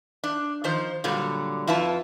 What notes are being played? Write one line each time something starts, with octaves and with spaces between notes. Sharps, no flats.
D4
D#3 F3 C5
A#2 D3 F#3 G3
F2 E4 F4 B4 A5